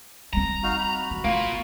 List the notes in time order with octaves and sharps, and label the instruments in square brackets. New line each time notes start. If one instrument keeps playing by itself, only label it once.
[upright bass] G3 C4 [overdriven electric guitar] A#5
[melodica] D#4 F#4 F5
F#4 B5
[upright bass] G2 E3
[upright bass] A3 [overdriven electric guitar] A#3 F4 [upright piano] F5